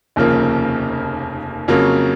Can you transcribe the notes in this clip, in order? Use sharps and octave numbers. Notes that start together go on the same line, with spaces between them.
F1 D#2 C#3 F3 A#3
F2 C#3 F#3 A#3 C#4